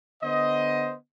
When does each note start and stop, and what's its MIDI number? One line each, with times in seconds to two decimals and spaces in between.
0.22 0.94 50
0.22 0.94 59
0.22 0.94 72
0.22 0.94 75